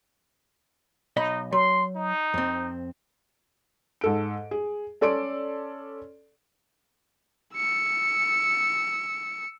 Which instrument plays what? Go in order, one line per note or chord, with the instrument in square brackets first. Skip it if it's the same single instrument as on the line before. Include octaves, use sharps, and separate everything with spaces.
[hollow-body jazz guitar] B1 D#5 B5 [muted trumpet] D#4
[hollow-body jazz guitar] F#3 [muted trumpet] C6
[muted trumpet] D#4
[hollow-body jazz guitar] F2 C4
[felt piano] G#2 A4 D7
G#4
C#4 A4 D5 C6 D7
[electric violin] E6 C#7